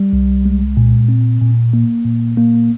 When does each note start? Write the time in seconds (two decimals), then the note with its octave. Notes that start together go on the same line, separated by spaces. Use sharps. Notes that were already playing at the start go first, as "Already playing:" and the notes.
Already playing: G3
0.13 C2
0.46 G#3
0.77 A#2
1.08 C4
1.41 A#2
1.73 A#3
2.05 A#2
2.37 A#3